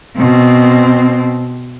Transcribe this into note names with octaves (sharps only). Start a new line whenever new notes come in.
B2 C4